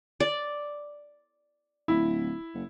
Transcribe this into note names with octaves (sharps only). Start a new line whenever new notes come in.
D5
D1 E4
F#1